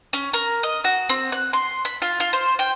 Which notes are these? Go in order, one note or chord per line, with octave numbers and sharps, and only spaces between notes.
C#4
A#4
D#5
F#4
C4
F#6
C6
B5
F4
F4
C5
G5